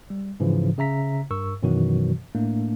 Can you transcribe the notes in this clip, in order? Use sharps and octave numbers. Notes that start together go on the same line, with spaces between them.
G3
G#2 C#3 E3 F3
C#3 E5 A#5 B6
G2 A#4 C#6 E6
F#2 B2 D#3 E3 F#3 F#4
A2 A3 A#3 D4